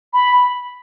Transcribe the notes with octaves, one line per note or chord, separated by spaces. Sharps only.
B5